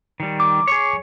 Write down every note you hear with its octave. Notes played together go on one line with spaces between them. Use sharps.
D#3 G3
D6
G#4 C#5